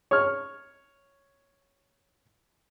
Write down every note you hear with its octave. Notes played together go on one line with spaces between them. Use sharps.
C#5 F6